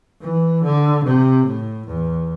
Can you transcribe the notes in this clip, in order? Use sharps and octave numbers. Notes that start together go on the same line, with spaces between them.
E3
D3
C3
A2
E2